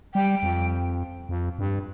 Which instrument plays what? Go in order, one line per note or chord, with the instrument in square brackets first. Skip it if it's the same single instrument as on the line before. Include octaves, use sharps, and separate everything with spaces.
[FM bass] G3 [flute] G5
[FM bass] F2
F2
G2